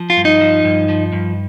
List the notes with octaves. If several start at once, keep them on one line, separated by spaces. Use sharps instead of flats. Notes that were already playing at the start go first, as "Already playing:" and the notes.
Already playing: F3
F4
G2
D#4
F3
G2
F3
G2